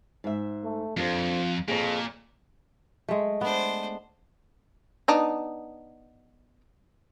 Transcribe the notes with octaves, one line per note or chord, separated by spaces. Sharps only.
G#2 E5
A3
F2 D4 F4 A4 C5
F2 A#2 G#4 C#5
G#3 A3
B3 D4 C5
B3 D4 D#4